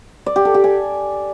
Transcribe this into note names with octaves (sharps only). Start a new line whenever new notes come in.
D5
G4
A4
G4
G#5